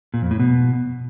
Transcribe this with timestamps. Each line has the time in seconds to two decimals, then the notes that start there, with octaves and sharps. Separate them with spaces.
0.14 A#2
0.22 F2
0.31 A2
0.40 B2